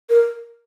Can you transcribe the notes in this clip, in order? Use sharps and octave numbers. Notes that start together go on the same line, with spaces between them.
A#4